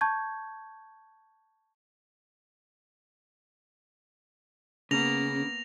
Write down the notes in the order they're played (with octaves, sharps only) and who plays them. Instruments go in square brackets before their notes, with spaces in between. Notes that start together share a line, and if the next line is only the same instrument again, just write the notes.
[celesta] A5 C#6 G6 G#6
[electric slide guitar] C#3 [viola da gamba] A#3 B3 [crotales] A#6 F7